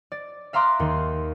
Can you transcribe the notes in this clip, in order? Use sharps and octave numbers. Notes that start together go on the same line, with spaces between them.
D5
E5 F5 A#5 C6 D6 F#6
D#2 D#3 C6